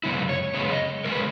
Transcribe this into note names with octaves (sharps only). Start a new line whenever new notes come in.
F#2 C#3 G#3 B3 E4
C#5
F#2 C#3 G#3 B3 C#5
D#5
C#3 G#3 A#4
B4